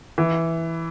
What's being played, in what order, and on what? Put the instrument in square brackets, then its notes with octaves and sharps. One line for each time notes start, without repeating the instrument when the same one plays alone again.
[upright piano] E3